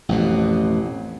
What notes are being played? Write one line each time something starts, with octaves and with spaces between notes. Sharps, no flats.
A1 F2 B2